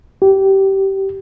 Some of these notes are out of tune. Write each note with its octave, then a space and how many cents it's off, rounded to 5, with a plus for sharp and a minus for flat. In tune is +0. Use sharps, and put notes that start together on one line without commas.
G4 -20